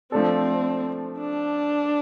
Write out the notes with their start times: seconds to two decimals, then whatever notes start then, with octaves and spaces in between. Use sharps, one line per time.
0.12 F3 A3 C4 D4 A4
1.19 D4